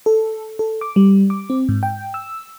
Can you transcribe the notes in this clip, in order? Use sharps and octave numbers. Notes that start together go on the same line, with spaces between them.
A4
A4
D6
G3
D6
C4
G#2
G5
E6